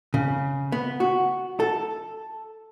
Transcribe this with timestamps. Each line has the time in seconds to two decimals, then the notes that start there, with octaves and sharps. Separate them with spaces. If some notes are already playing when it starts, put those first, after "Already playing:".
0.14 C#3
0.72 B3
1.00 F#4
1.60 A4